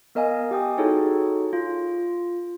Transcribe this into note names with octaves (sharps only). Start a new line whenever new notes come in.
B3 A#4 D#5 F5 G#5
G4 G5 D#6
D#4 E4 F#4 G#4 A4 C#5
F4